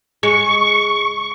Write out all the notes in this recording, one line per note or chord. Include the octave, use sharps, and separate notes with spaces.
G#3 C#6